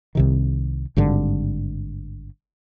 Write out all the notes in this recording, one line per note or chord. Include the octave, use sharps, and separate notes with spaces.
C2 C3 D#3
G#1 G2 D3